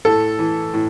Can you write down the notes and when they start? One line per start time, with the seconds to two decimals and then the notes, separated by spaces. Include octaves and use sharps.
0.05 A2 A4
0.39 E3
0.74 A2